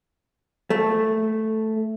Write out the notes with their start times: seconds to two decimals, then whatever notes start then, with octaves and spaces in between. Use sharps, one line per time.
0.70 A3